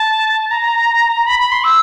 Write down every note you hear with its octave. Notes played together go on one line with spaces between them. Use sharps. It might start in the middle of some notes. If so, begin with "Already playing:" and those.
Already playing: A5
A#5
B5
B5
C6
E6